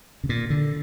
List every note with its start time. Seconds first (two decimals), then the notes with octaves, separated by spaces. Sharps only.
0.24 C#3
0.29 A#2
0.50 D3